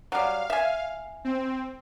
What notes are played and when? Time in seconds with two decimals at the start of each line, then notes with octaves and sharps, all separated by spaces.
0.12 F#3 G3 F5
0.50 E5 G#5
1.24 C4